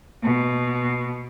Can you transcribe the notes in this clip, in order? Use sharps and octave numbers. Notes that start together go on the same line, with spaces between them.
B2